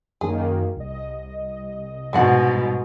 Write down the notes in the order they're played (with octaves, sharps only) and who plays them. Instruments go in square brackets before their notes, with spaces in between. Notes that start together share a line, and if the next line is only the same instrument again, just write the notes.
[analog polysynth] F#2 D#3 A#3 [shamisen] G#4
[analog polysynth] C2 D#5
[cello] G#2 B2 [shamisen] B3 D4 F#5